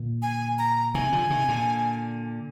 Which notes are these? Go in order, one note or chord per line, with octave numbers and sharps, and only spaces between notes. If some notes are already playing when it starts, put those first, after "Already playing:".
Already playing: A#2 D3
G#5
A#5
C3 D#3 G#5
D3 F3
C3 D#3
A#2 D3